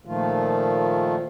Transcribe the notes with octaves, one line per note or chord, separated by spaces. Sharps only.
A#2 D#3 F3 A3 F4